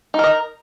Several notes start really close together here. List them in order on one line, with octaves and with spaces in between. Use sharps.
D#4 A#4 D#5